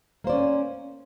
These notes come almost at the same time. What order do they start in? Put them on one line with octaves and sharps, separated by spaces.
A#3 C5 D5 C#4